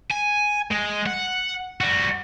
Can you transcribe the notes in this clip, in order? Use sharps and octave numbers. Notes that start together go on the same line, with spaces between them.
G#5
G#3
F#5
G3 F#4